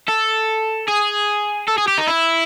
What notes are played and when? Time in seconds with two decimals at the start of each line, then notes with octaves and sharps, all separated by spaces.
0.08 A4
0.88 G#4
1.68 A4
1.78 G#4
1.88 G4
1.98 D#4
2.08 E4